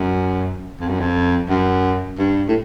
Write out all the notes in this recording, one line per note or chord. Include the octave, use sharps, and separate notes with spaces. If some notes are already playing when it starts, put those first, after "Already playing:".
Already playing: F#2
F2
F#2
F2
F#2
G2
A2